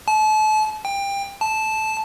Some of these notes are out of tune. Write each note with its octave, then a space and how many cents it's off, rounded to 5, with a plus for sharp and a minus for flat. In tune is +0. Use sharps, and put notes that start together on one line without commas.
A5 -35
G5 +25
A5 -10